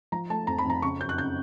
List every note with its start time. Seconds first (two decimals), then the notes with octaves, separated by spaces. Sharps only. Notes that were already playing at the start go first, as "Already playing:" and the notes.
0.12 F3 A#5
0.30 A3 A5
0.47 F2 A#5
0.58 B5
0.65 F2 A#5
0.82 C#3 C#6
1.00 F#2 G6
1.09 F#6
1.18 C#3 G6